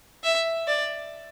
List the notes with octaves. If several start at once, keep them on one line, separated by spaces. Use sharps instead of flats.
E5
D5